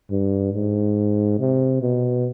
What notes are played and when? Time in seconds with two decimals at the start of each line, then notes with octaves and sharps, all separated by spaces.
0.11 G2
0.53 G#2
1.39 C3
1.81 B2